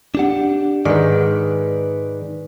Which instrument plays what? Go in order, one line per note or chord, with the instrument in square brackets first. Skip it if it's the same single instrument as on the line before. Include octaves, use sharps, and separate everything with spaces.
[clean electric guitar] D4 G4 F#5
[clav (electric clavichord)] G#2 D#3 [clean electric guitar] B4 D5